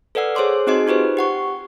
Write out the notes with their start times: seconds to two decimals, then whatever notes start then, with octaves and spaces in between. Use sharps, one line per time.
0.15 A4 B4 D5 F#5 E6
0.35 G#4 C5 C#5 C6 D6
0.67 C4 D#4 F#4 G#4 D#5 C6
0.87 D#4 F4 G4 B4 C5
1.17 G4 F#5 C#6